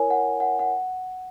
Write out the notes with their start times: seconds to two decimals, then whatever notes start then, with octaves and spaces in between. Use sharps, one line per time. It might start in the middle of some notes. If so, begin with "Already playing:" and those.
Already playing: E4 A#4 C#5 G#5
0.10 F#5
0.40 F#5
0.59 F#5